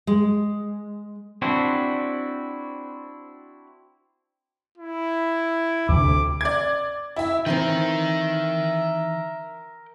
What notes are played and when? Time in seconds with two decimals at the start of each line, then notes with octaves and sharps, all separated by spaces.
0.07 G#3
1.42 C4 D4 E4 F#4
4.78 E4
5.89 D2 C3 D6
6.41 D5 G#6
7.16 E4 E5
7.46 D#3 E3 C4 A#4 E5 G5